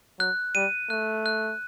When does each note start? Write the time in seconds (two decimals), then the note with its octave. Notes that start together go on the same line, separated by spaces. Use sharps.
0.19 F#3 F#6
0.55 G3 D#7
0.90 A3 F#6
1.26 F#6